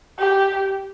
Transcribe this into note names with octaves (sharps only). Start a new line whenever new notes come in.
G4